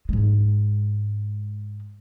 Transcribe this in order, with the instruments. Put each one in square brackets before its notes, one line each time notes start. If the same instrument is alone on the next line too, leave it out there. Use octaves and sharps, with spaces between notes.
[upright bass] G#2 G#3